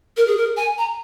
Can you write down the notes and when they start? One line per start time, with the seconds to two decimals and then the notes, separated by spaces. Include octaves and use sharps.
0.17 A#4
0.27 G#4
0.37 A#4
0.57 G#5
0.78 A#5